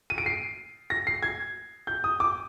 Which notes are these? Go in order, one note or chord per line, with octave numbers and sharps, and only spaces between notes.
D#7
D7
C7
A#6
C7
G#6
G6
D#6
D6